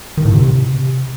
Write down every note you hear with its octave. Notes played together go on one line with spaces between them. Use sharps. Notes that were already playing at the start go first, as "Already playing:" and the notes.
D#3
A2
C3